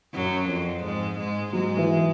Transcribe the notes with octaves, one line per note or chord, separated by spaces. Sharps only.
F#2 F#3
F2 F3
G#2 G#3
G#2 G#3
G#2 F#3 G#3
E3